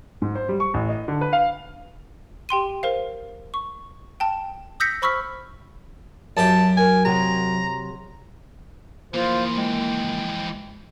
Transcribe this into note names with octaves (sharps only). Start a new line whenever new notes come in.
G#2
C5
G3
C#6
A1
D#5
D3
B4
F5
G4 G5 C6 D#7
A#4 C5 F5
C#6
G5 A5
D#6 E6 G6 A#6 B6 C#7
C5 B5 C#6 E6 F6 B6
F#2 G4 F5 A5
A#4 G#5
C3 F#3 G#4 A#5
E3 F3 A#3 F4 C5
G#3 G5